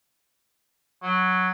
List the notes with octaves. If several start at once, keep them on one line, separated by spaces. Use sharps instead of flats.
F#3